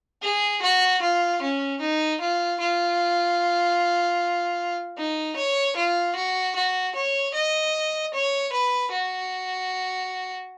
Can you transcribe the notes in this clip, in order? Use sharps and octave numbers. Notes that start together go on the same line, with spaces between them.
G#4
F#4
F4
C#4
D#4
F4
F4
D#4
C#5
F4
F#4
F#4
C#5
D#5
C#5
B4
F#4